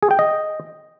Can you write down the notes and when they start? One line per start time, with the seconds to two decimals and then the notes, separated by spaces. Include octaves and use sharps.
0.03 G#4
0.11 G5
0.19 D#5